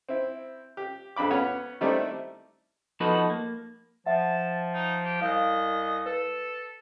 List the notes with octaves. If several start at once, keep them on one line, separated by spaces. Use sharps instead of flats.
C4 E4
G4
A#1 F2 D4 B5 D6
B3 C#4 B4 C#5
D#3 G3 A3 C4 E4 D5
F3 B3 D#4 F#4 A4 B4
A#3
F3 E5 F#5 A5
D#4
G4
C2 D#5 F5
A4 B4